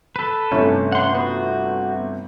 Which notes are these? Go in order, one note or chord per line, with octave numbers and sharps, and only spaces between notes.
A4 B4
G1 C3 A3 C#4
F#5 C6
B3 F#4